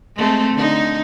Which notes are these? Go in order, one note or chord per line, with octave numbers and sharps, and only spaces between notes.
G#3 A3 C4
D3 D#4